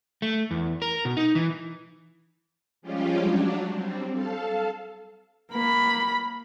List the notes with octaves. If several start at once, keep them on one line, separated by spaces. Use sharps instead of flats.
A3
E2
A#4
B2
D#4
E3
F3 G3 G#3 C#4 F4 G4
F#3 D4
G3 C4
A4 F5 A5
A#3 B5